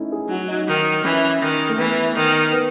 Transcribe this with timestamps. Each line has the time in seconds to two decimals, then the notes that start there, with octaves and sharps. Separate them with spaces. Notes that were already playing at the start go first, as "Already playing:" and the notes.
Already playing: A3 C#4 D#4 E4
0.12 G#4
0.30 F#3 F#4
0.48 D#4
0.68 D#3
1.04 E3 C#4
1.42 D#3
1.69 A3
1.78 E3 B3
2.16 D#3
2.52 B3